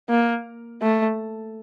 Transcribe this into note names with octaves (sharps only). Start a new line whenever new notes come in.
A#3
A3